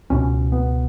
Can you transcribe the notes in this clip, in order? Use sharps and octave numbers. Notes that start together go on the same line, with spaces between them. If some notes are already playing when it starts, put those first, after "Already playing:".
C#2 B2 C#4
B3